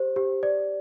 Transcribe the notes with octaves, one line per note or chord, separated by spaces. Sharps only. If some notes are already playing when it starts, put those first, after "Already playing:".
Already playing: G4 C5
G4
D5